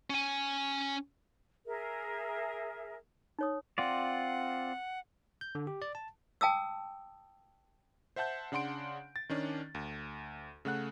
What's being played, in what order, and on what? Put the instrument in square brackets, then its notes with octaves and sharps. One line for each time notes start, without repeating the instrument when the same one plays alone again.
[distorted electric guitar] C#4 G#5
[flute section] G#4 A#4 E5
[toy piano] D#4 C#5 D#6
[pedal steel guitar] C4 F4 D5 [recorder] F#5
[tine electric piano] G6
D3
G4
D5
A5
[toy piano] G5 A5 D#6 E6
[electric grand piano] C5 E5 F#5 A5 G6
C#3 D4 F#5 C6 D7
A6
D#3 C#4 D4
D2
C#3 A3 F#5 F#6